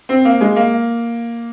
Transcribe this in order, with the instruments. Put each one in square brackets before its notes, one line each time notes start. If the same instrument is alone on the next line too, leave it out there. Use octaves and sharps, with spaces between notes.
[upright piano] C4
A#3
G#3
A#3